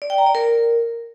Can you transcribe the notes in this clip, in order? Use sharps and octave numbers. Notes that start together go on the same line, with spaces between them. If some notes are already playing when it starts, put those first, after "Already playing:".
D5
G5
A#5
D5
A#4